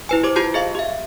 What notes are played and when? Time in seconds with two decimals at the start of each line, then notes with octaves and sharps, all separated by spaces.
0.09 E4 B4 G#5
0.23 G4 C5 D6
0.36 F4 G4 A5 G6 C7
0.54 G#4 D#5 F5
0.75 G4 E5